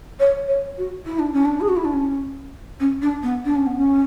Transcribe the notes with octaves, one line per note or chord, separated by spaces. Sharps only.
C#5
C#5
F#4
E4
D4
C#4
D4
G#4
F#4
E4
D4
C#4
C#4
D4
B3
D4
C#4
B3
C#4